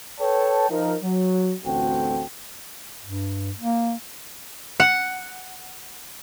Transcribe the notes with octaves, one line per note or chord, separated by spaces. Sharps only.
A4 B4 C#5 G5 A5
F3 D#4 A#4
F#3
A1 D2 C4 F#4 A4 G5
G2
A#3
F#5